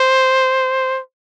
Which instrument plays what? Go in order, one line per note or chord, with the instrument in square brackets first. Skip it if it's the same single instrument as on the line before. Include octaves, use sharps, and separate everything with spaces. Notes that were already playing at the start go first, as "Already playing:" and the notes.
Already playing: [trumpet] C5